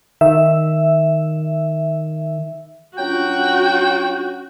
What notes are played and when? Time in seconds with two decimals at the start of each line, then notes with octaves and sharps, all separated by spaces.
0.21 D#3 E5
2.98 F#3 C#4 D4 F4 F#4 G5